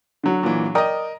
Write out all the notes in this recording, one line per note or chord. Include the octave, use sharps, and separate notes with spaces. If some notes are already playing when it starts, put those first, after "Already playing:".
D3 F#3
A#2 E3
A#4 D5 D#5 G5 D#6